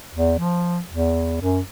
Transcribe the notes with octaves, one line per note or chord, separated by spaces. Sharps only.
E2
F3
E2
F#2